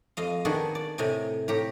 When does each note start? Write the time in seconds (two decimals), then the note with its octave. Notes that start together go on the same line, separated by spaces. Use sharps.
0.17 F2 D#5 F5
0.45 D#3 B3 D4 F#4 G#4
0.75 D5
0.98 A2 C3 D#5 G#5
1.48 A2 G4 A#5